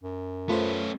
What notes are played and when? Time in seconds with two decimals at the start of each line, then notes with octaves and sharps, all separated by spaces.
0.03 F#2
0.49 A3 B3 C#4 F4 B4 C5